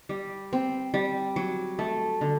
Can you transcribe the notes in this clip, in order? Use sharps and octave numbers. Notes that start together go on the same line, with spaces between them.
G3
C4
G3
F#3
A3
D3